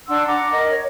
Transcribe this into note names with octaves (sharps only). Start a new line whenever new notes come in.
D4 F#5 C6 E6
F#5 A#5 D6
A#4 D#5
C#5